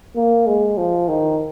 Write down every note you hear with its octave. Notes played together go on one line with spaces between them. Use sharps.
A#3
G#3
F3
D#3